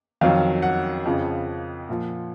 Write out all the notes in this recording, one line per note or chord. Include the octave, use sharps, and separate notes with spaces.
F2 D#3 F#3 F5
F#5
F2 C#3 F3
A#2 F3